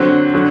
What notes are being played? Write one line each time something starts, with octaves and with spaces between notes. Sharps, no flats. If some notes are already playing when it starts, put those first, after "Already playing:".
Already playing: D3 F#3 C4
D3 F#3